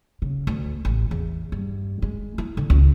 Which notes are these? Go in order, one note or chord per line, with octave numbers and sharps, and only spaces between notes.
C#3
D2
A1
E2
G2
G#3
E4
D3
C#2